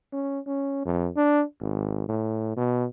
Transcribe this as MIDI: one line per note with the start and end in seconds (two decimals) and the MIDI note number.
0.13 0.40 61
0.47 0.83 61
0.86 1.09 41
1.17 1.43 62
1.61 2.05 32
2.09 2.53 45
2.57 2.86 47